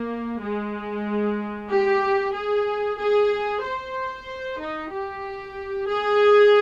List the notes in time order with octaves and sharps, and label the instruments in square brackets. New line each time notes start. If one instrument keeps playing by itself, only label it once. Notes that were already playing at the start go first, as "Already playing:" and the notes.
Already playing: [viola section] A#3
G#3
G4
G#4
G#4
C5
D#4
G4
G#4